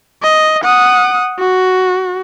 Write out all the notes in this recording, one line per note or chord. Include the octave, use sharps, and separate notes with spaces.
D#5
F#5 D#6
F#4